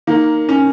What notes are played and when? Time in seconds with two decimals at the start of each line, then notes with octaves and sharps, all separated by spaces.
0.07 D#3 A#3
0.49 C#4